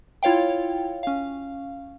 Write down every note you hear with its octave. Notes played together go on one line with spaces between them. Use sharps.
E4 F4 C#5 F5 G5
C#4 F5